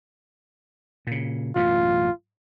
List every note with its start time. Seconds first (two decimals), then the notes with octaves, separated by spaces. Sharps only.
1.07 A#2 C#3
1.56 A1 F#2 B2 F4